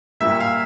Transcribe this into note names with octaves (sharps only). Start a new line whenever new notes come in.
A#2 G3 A#3 E5
F5